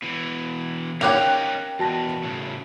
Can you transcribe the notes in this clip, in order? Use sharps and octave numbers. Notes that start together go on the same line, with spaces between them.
B2 E3
A#3 C#4 D#4 G4 C#5 G5 F#6 F7
E2 B2 F#4 A5 A#6
A2 C#3